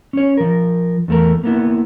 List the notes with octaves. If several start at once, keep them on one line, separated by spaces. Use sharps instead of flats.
C#4 C#5
F3 A#4
E2 A3 A#4
A#3 B3 E4